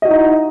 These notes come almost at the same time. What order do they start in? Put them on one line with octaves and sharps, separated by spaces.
D#5 F#4 E4 D#4